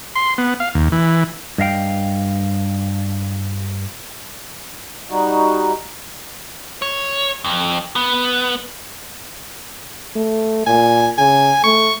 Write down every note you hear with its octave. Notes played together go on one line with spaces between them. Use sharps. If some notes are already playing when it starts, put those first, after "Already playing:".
C6
B3
F5
D#2
E3
G2 D#5 F5 G5
G3 D#4 F#4
C#5
F2
B3
A3
A#2 G#5
C#3 G#5
A3 C#6